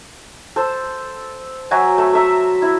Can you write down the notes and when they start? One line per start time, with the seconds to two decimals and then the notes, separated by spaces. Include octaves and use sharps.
0.56 A4 C5
1.71 F#3 F#4 E5 G#5
1.98 A3
2.13 A4 E5 A#5
2.62 E4